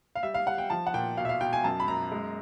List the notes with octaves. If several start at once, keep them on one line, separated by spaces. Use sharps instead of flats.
F5
G3 E5
F5
G3 F#5
G5
F3 A5
F#5
A#2 G5
B2 F5
E5
F5
B2 G5
G#5
F#2 A5
B5
F#2 A#5
G#3